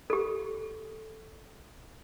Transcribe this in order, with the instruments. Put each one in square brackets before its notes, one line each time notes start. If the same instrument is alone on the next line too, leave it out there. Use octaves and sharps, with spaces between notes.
[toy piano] G4 A4